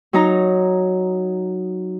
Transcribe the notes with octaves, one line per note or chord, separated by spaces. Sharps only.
F#3 D#4 A#5